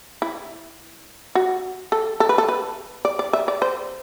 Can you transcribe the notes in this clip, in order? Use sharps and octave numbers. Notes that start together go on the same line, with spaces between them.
E4
F#4
A4
A4
B4
A4
B4
D5
D5
E5
D5
C5